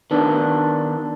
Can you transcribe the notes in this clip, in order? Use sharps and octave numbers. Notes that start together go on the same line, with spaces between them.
D#3 B3 D4